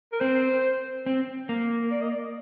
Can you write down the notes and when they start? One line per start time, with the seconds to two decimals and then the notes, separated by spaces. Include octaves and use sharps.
0.13 A#4
0.20 C4 C5
1.06 C4
1.49 A#3
1.91 D5
2.01 D#5
2.11 D5